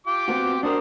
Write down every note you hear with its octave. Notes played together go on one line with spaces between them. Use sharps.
F4 G4 D6
B3 C4 F#4
D4 F#4 A#4 C5 D#6